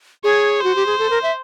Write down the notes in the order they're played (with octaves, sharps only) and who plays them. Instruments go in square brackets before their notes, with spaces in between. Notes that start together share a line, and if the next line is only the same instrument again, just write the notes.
[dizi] G#4 [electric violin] C#5
[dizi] F#4 [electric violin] C5
[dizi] G4
G#4
A4
A#4
E5